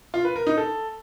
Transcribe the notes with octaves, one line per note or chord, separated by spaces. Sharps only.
F4
B4
A#4
D#4
A4